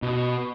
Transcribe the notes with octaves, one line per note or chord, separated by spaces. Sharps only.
B2